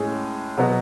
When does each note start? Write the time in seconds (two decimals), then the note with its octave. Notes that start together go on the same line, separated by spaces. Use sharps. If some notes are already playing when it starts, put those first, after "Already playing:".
Already playing: A2 G#3 C#4 G#4
0.57 B2 F#3 B3